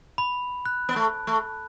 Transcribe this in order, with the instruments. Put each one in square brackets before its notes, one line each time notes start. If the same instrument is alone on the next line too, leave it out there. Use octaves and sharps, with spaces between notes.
[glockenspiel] B5
F#6
[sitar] B3
A3
A3